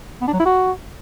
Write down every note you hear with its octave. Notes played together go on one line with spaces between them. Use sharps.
B3
D4
F#3
E4
F#4